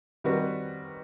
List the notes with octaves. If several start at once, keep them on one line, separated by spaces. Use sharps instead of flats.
D#3 G3 C4 F#4 B4